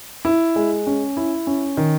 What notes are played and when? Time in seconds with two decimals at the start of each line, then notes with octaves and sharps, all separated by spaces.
0.25 E4
0.56 G#3
0.86 C#4
1.17 E4
1.47 C#4
1.77 D#3